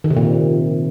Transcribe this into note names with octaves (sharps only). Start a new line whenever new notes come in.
D#3
C3
A#2